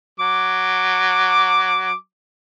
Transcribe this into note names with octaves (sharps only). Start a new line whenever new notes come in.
F#3 D6